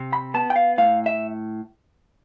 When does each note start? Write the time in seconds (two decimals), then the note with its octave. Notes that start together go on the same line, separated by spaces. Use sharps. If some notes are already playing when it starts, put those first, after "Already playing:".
Already playing: C3
0.13 B5
0.34 B3 A5
0.50 G5
0.56 F5
0.78 A2 F5
1.06 E5